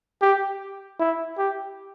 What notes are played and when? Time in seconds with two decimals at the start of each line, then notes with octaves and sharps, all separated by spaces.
0.22 G4
1.00 E4
1.38 G4